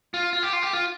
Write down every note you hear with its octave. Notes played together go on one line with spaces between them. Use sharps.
F4
F4
G4
F4
G4
F4